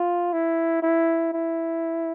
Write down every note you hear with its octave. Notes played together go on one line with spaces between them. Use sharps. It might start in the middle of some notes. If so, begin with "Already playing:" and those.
Already playing: F4
E4
E4
E4